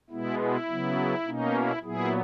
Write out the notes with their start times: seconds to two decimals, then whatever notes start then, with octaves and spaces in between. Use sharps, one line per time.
0.10 B2 G#3 B3 E4
0.39 E4
0.68 C#3 F#3 B3
1.26 B2 A#3 C#4 D#4
1.54 E4
1.83 A#2 F#3 B3 E4 G#4